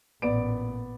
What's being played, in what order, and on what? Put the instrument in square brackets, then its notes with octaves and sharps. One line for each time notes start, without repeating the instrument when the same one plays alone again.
[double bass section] A1 A#2 [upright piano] B3 D5 D7